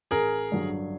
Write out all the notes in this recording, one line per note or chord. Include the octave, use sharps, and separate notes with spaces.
A1 G#4 A#4
G2 D3 F#3